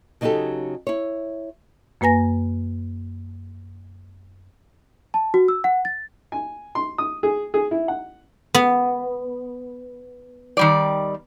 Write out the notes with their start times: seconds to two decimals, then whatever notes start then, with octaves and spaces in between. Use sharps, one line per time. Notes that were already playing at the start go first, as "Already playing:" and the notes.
0.21 C#3 F#3 D#4 F#4 G4 A4
0.87 E4 C#5
2.01 F#2 A#3 B4 G#5 A#6
5.14 A5
5.34 F#4
5.48 E6
5.64 F#5
5.85 A6
6.32 G#5
6.75 C6
6.98 D#6
7.23 G#4
7.54 G#4
7.71 E4
7.88 F#5
8.54 B3
10.57 D#3 G3 D5